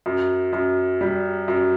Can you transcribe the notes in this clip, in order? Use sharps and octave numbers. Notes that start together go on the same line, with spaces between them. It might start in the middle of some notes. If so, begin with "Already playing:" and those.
F#2
F#2
G3
F#2